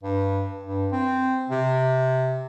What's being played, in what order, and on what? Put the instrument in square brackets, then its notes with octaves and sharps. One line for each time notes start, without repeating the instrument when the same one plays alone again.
[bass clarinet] G2
G2
C4
C3